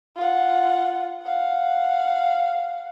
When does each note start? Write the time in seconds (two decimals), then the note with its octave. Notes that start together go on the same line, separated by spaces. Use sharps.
0.17 F4 F#5
1.23 F5 F#5